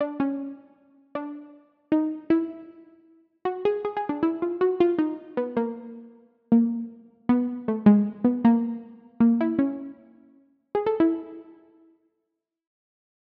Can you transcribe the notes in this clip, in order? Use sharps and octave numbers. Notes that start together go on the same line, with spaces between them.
D4
C#4
D4
D#4
E4
F#4
G#4
G#4
G#4
D4
E4
F4
F#4
F4
D#4
B3
A#3
A#3
B3
A3
G#3
B3
A#3
A#3
E4
C#4
G#4
A4
E4